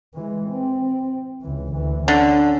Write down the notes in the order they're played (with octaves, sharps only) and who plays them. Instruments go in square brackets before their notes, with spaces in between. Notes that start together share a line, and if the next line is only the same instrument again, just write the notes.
[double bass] E3 G#3
C4
C#2 E3
D2 E3
[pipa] D3 [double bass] C#4